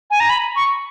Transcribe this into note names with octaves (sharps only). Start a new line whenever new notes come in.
G#5
A#5
B5
C#6